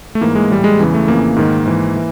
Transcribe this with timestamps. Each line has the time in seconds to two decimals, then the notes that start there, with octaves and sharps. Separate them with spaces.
0.15 A3
0.21 G#2 E3 A#3
0.35 G#3
0.50 A2 E3 G3
0.64 G#3
0.79 E2 C#3 E3
0.94 A3
1.08 F2 C#3 E3 A#3
1.36 G#2 D#3
1.65 G#2 E3
1.96 E3